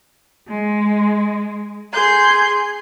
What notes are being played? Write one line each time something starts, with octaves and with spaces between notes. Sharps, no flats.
G#3
G#4 C6 G6